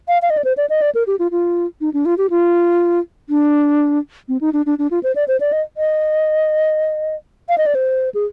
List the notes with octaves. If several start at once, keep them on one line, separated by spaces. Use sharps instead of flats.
F5
F5
D#5
D5
C5
D5
D#5
D5
A#4
G4
F4
F4
D#4
D4
F4
G4
F4
D4
C4
D#4
D4
D4
D4
F4
C5
D5
C5
D5
D#5
D#5
F5
D#5
D5
C5
G#4